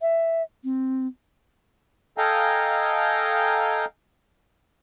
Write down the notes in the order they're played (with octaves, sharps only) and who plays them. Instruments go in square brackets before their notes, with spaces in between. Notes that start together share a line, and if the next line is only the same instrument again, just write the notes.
[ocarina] E5
C4
[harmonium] A4 D#5 F5 G5 G#5 A#5